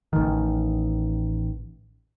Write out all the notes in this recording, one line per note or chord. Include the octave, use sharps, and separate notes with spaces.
A1 D#3